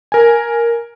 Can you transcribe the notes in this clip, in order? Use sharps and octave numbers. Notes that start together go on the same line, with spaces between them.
A#4 G#5